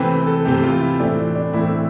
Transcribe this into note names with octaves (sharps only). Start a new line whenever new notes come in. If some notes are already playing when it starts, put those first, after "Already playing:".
Already playing: C3 E3 A3 C4 B4
A4
C3 E3 A3 C4 G4
F4
E4
A2 E3 A3 C4 D4
D4
A2 E3 A3 C4 E4